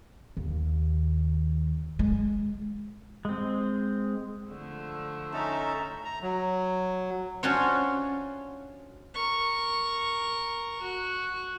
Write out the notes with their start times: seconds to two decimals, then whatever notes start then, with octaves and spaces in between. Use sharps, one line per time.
0.37 D#2
1.99 G#3
3.25 G#3 C4
4.49 D3 F3 A3
5.33 C#4 D#4 A4 E5 A#5
6.05 A#5
6.22 F#3
7.43 C#4 D4 F4 F#4 C5 C#5
9.14 A#4 C#6
10.81 F#4